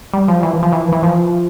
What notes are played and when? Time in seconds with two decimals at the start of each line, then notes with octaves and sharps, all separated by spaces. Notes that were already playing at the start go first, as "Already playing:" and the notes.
0.14 G3
0.28 F3
0.43 E3
0.63 F3
0.72 E3
0.92 E3
1.03 F3